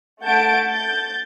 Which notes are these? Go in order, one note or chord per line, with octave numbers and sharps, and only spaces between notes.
A3 F#5 A5 G6 A6 D7
G6 A6